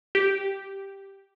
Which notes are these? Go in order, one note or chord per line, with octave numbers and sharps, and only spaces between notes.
G4